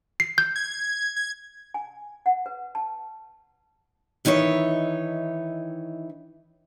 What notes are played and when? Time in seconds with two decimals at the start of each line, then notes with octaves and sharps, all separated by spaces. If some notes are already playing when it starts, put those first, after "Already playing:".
0.20 C7
0.38 G6
0.56 G#6
1.16 G#6
1.74 G#5
2.26 F#5
2.46 B4
2.75 A5
4.25 D#3 E3 D#4 C#5 E5